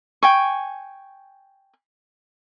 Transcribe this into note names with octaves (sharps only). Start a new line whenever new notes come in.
G5 G#5 C#6